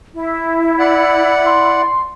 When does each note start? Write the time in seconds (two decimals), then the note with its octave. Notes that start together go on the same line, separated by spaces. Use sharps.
0.15 E4
0.79 D5 F#5 C#7
1.46 C6